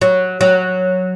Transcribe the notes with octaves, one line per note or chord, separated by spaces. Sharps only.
F#3
F#3